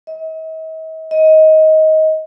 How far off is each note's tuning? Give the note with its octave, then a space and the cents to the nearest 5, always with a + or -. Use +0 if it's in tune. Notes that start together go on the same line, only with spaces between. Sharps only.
D#5 +45
D#5 +15